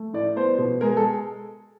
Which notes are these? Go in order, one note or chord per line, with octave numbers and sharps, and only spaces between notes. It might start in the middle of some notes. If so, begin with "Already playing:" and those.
Already playing: A3
A2 D5
B3 C5
B2
G#3 A#4
A4